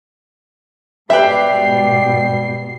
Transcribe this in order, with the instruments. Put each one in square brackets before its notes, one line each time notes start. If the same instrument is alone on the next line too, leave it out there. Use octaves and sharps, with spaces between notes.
[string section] G#2 B2 C7 [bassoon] G3 [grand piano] G4 G5 [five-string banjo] B4 E5